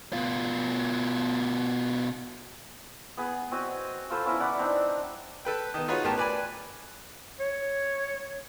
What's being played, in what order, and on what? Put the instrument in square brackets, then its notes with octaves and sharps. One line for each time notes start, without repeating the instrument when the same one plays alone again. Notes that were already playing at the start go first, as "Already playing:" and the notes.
[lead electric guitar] B2 F4
[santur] B3 G#4
C4 F#4 D#5
F4 A4 C5 B5
B3 C#4 E4 A#5
D5 F#5 B5 D6
C4 D4 D#4
[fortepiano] A4 B4 G5
D#3 B3
D#4 F4 F#4 G#4 B4 C#5
A1 B3 G4 A#4 A5
B4 D5 G#5 B5
[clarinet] C#5